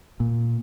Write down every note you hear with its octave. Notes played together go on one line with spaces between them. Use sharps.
A#2